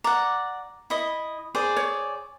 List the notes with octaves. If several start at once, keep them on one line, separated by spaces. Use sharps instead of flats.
D5 F#5 A#5
E4 D#5
G#4 C5 D5
C#5